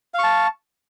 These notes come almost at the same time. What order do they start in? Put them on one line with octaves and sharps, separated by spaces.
F5 C#6 A5